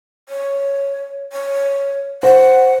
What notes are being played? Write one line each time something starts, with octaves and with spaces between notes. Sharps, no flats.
C#5
C#5
C5 F#5